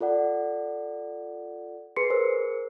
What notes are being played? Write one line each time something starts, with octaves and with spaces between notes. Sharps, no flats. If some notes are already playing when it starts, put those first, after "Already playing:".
F4 A4 D5 F#5
G#4 B4 C6 C7 C#7
G#4 A#4 C5 E6